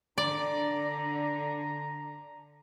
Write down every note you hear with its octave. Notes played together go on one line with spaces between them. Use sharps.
D3 D5 A#5